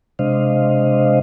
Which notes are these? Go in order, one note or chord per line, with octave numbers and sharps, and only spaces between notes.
C3 G#3 D4 C5 D#5 F5